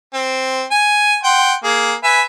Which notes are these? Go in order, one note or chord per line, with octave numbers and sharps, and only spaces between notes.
C4
G#5
F#5 G5 C6
A#3 G#4
B4 E5 G#5